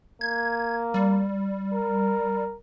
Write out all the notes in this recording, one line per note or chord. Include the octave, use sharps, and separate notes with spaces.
A#3 G#6
G3
A#4